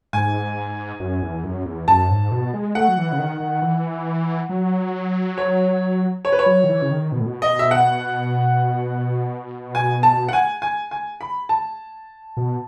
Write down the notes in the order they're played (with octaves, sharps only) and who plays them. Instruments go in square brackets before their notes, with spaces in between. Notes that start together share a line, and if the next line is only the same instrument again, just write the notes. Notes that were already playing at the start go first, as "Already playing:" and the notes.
[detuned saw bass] G#2 [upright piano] G#5
[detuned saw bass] F#2
E2
F#2
E2
[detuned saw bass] F#2 [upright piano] A5
[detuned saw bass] G#2
B2
G#3
[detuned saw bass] A3 [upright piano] F#5
[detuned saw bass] F#3
E3
C#3
D#3
D#3
E3
F#3
[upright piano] C#5
C#5
B4
C#5
[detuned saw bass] F#3
D#3
E3
C#3
D#3
B2
A2
B2
[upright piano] D#5
E5
F#5
G#5
A5
F#5
G#5
G#5
G#5
B5
A5
[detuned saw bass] B2